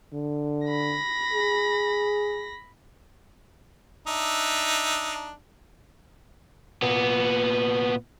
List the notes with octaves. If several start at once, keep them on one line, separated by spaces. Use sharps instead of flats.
D3
B5 A#6
G#4
D4 D#4 E5
A#2 B3